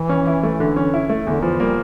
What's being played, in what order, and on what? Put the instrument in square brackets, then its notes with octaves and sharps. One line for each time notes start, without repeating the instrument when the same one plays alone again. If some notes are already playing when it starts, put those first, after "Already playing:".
Already playing: [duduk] E3
[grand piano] C#4
E4
A3
D3
C#4
E4
A3
[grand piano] E2 [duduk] D3
[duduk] E3 [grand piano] F3
[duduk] G3 [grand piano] A#3